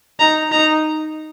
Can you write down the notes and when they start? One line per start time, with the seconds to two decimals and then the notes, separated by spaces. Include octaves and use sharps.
0.20 D#4 A#5
0.52 D#4 A#5